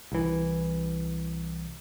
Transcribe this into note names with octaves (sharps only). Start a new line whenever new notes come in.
C2 E3